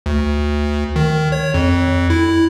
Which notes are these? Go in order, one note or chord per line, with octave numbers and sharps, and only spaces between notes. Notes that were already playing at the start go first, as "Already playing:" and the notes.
D2
D#3
C#5
F2
E4